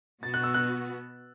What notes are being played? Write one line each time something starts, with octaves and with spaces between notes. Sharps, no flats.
B2 B3 F#4 A6
F#6
E6
F#6